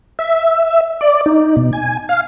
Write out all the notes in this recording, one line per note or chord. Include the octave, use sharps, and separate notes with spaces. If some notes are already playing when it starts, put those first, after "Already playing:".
E5
D5
D#4
B2
G#5
F5